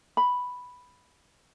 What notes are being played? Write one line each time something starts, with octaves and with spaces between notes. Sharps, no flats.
B5